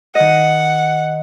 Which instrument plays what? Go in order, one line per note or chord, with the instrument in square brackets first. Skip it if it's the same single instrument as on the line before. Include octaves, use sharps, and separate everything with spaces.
[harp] D#3 D#5 [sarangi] F#5